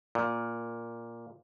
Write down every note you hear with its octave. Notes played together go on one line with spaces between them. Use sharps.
A#2